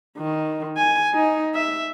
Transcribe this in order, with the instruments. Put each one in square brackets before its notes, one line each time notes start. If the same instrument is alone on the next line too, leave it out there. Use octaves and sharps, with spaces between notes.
[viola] D#3
G#5
D#4
E5